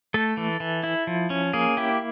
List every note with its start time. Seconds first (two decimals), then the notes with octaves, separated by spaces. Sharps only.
0.14 A3 A4
0.37 E3
0.60 E3
0.83 E4
1.07 F3
1.30 C#4
1.53 A#3 G#4
1.77 E4 G4